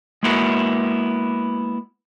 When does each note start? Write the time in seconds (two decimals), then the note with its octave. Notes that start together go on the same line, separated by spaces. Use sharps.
0.23 G#3 A#3 B3 E4 F#4 A#4